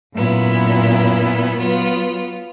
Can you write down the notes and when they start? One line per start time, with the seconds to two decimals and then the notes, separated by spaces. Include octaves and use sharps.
0.14 F#2 A#2 B3 E4
1.57 F#3 B3 F4